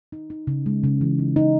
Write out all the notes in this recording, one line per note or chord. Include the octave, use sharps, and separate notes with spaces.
D#4
D#4
C#3
G#3
C#3
E3
D#4
D#4